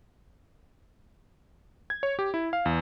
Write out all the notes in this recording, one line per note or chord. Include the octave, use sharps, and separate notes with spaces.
G#6
C#5
G4
E4
F5
E2